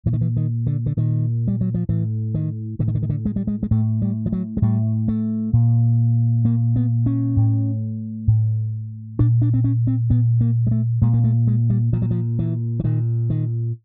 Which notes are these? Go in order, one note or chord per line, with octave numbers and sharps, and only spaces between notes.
A#2 E3
D#3
E3
D#3
D3
D3
A#2 D#3
G3
F#3
F3
A2 E3
D#3
A2 D3
D#3
D3
D#3
D3
G#3
G3
G#3
G#3
A2 A3
G3
F3
F#3
G#3
A2 G3
A3
A#2
A#2 A#3
B3
C#4
A2
A2
A#2 D4
D4
C4
C#4
C4
A#2 B3
A#3
G#3
A3
A#2 G#3
A#3
A3
G#3
G3
A#2 F3
F#3
F3
E3
E3
A#2 D#3
D#3